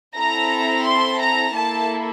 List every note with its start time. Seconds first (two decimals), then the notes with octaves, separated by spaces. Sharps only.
0.16 C4 E4 A4 A#5
0.85 C6
1.20 A#5
1.54 A#3 E4 A4 A5